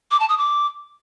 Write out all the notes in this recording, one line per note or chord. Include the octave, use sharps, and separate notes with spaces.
D6
A5
D#6
D6